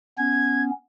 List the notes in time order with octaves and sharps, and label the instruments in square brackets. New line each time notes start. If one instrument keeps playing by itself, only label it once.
[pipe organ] B3 C#4 [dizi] G#6